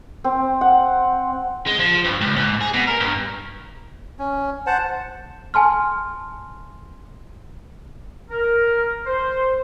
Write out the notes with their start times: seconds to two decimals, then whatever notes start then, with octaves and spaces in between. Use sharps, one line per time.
0.24 C4
0.61 F#5
1.67 G#3
1.80 F3
2.05 G2
2.21 C#2
2.36 G#2
2.61 G#4
2.73 B2
2.87 A#4
3.00 G2
4.19 C#4
4.67 C5 F#5 A5
5.54 G#5 A5 C6 F6
8.30 A#4
9.06 C5